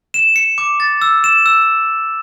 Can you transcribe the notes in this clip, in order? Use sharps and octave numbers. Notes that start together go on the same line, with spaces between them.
E7
C#7
D6
A6
E6
E7
E6